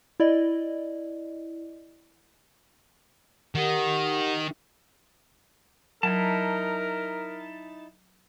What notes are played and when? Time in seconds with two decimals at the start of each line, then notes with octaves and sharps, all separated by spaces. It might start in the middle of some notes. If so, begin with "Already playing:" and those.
0.20 E4 D5 D#5
3.55 D#3 G4 A#4 F#5
6.03 F#3 D#4 E4 A#4 A5